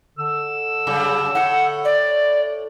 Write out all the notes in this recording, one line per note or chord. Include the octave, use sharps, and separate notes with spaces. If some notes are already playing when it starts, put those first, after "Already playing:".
D3 A4 E6
F#2 C#3 G3
A2 F#5
D5